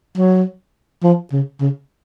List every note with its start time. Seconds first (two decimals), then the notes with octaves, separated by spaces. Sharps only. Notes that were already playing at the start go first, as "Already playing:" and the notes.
0.17 F#3
1.03 F3
1.32 C#3
1.61 C#3